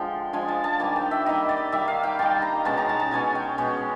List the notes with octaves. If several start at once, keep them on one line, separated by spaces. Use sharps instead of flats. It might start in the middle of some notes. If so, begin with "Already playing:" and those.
Already playing: D3 F3 G#3 G5
D3 F3 G#3 G#5
A5
A5
D#3 G3 A#3 D#4 G#5
G5
E5
D#3 G3 A#3 D#4 D#5
D5
D#3 G3 A#3 D#4 E5
F5
G5
D#3 G3 A#3 D#4 A5
A#5
B2 G#3 C#4 A5
A#5
A5
A5
B2 G#3 C#4 G#5
G5
B2 G#3 C#4